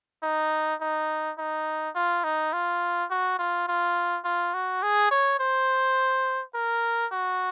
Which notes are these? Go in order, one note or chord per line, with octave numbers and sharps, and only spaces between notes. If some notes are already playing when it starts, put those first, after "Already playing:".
D#4
D#4
D#4
F4
D#4
F4
F#4
F4
F4
F4
F#4
G#4
C#5
C5
A#4
F#4